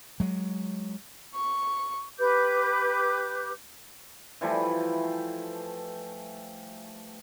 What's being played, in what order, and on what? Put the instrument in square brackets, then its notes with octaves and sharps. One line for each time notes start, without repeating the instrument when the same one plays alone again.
[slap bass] F#3 G#3
[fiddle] C#6
[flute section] G4 B4 D6 G6
[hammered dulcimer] E3 F3 G3 A3